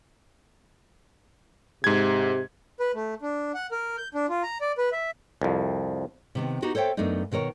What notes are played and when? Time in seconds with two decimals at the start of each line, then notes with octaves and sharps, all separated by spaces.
1.84 G#2 C3 G#6
2.80 B4
2.95 A3
3.22 D4
3.54 F#5
3.71 A#4
3.98 G6
4.15 D4
4.29 F4
4.43 A#5
4.61 D5
4.78 B4
4.92 E5
5.42 C2 F2
6.35 C3 D#3 B3
6.62 B3 D#4 F#4 G4
6.75 A4 C5 C#5 E5 G5
6.97 F#2 A3 B3 D4 D#4
7.32 B2 D#3 A#4 C#5